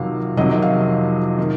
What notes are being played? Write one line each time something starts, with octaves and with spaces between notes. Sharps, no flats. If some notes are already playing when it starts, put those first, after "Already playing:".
Already playing: F2 C3 D#3 F#3 F5
F2 C3 D#3 F#3 D#5
D#5
F5
D#3